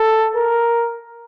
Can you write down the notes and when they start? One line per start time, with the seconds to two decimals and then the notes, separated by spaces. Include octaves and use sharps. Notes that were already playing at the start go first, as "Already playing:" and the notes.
Already playing: A4
0.35 A#4